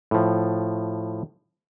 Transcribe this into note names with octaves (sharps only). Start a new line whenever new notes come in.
A2 F3